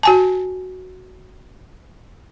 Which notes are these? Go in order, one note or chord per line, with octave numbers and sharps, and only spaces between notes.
F#4 G#5 A5